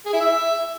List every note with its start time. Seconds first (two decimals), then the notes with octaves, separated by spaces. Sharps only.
0.06 G#4
0.13 E4
0.21 E5